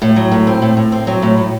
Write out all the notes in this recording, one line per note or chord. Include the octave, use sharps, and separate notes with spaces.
A2
F#3
A2
C4
A2
A2
C4
F#3
A2
A2